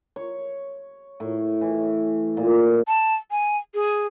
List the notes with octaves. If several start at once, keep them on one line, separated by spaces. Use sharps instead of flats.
C#5
A2
E3
A#2
A5
G#5
G#4